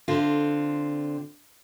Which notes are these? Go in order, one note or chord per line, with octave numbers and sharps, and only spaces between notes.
D3 C4 F4